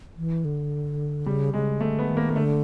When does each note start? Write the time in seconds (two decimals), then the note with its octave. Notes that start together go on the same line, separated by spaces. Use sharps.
0.17 E3
0.45 D3
1.26 C#3 G3
1.54 C#3 G#3
1.80 D3 A3
1.99 B3
2.09 D#3
2.17 A#3
2.29 A#3
2.36 D3 A3